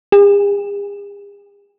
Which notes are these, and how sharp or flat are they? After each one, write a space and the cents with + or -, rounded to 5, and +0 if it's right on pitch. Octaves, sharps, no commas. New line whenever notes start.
G#4 -45